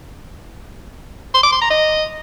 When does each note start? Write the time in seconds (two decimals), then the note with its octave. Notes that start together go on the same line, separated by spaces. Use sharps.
1.34 C6
1.43 D6
1.52 C6
1.61 A#5
1.70 D#5